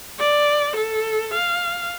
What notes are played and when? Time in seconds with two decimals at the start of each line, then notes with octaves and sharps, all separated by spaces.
0.19 D5
0.77 A4
1.34 F5